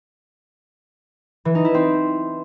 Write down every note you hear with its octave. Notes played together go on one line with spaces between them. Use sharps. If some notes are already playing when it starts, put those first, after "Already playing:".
E3
D#4
E4
C4